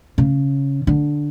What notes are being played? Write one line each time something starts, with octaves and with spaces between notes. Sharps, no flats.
C#3
D3